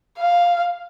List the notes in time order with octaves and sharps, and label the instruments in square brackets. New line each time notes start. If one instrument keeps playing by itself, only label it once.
[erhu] F5